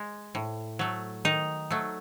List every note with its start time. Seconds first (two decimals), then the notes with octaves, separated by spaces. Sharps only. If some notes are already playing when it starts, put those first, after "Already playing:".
Already playing: G#3
0.35 A2
0.79 F#3 A3
1.25 D#3 D#4
1.71 F#3 A3